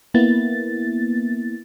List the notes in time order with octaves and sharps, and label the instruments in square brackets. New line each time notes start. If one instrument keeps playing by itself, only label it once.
[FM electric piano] A#3 B3 E4 A6